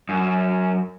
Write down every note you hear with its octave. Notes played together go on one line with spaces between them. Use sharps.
F#2